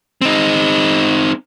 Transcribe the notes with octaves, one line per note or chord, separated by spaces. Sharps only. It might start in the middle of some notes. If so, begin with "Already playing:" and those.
C4 D#4